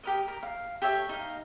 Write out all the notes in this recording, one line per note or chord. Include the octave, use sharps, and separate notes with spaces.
G4 A#4 D#5
A#4
F5
G4 A4 C#5 E5
D#4 F5